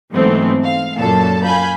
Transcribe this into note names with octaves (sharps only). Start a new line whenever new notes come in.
G#2 E3 F#3 A3 B3 C4
F5
F#2 A#2 A4 A5
F5 G#5 B5 G6